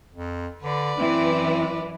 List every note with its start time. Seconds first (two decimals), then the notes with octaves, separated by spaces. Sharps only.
0.14 F2
0.63 D3 B4 D5
0.98 F#2 E3 C4